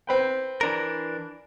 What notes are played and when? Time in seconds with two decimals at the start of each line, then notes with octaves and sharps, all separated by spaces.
0.07 C4 B4 G5
0.61 E3 D4 A#4